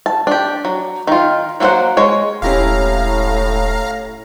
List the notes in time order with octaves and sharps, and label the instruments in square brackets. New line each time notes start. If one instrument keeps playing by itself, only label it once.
[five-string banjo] A5
D4 G4
F#3
D#3 F4
F#3 A#3 C#4 C5 F#5
G#3 C#5
[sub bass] E1 [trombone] A2 [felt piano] C#4 E4 G4 [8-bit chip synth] F5 A#5